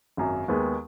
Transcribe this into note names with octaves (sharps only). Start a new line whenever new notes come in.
G#1 F#2 F#3
D#2 D#3 G#3 B3